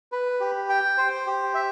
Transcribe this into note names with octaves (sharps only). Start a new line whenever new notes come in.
B4
G4
G5
C5
G4
E5